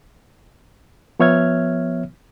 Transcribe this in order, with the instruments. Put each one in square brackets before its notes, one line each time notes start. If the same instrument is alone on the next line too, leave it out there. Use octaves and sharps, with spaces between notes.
[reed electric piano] F3 B3 C#5 E5 F6 G#6